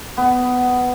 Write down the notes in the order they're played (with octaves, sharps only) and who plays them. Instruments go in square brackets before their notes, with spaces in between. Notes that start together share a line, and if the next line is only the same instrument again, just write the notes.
[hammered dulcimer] B3